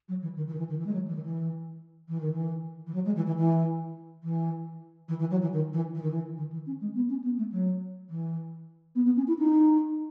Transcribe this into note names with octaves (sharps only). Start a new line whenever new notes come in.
F#3
E3
D#3
E3
D#3
E3
D#3
E3
G#3
F#3
E3
D#3
E3
E3
D#3
E3
E3
F#3
G#3
E3
E3
E3
E3
E3
E3
F#3
E3
D#3
E3
E3
D#3
E3
D#3
E3
C#4
G#3
B3
C#4
B3
A3
F#3
E3
B3
B3
C#4
E4
D#4